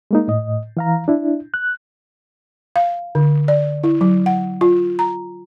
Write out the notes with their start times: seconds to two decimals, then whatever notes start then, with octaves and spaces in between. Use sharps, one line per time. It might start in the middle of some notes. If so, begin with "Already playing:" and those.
0.11 G#3 A#3 D#4
0.28 A2 D#5
0.77 E3 F5 A#5
1.08 D4 E4
1.54 F#6
2.76 F5
3.15 D3
3.48 D5
3.83 E4
4.01 F#3
4.26 F#5
4.61 F4
4.99 A#5